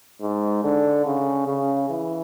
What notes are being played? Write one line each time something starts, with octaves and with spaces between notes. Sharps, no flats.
G#2
D3
C#3
C#3
E3